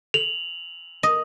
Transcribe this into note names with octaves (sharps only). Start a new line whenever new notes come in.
F7 F#7
D#5